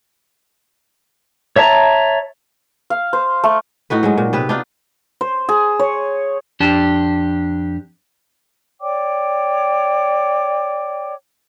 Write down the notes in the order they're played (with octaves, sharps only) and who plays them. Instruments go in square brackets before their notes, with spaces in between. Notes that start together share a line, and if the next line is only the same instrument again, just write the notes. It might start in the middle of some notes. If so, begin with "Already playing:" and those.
[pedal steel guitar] C#5 E5 A5 A#5
[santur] F5
C5
A3
[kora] A2 D#4 F#4 B4
G#2 F#3 G#3
A#2
C3 B3 B4
D4 D#4 F4
[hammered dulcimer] C5
G#4
C#5
[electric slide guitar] F2 D4 G4 A5
[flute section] C#5 D5 G5 D6